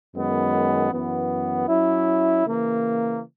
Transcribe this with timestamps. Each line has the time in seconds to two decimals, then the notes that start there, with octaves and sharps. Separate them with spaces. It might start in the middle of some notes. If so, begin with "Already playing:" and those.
0.14 F#2 D#3 G#3 B3
0.91 F#2 E3 B3
1.67 F#3 C#4 E4
2.44 C#3 E3 A#3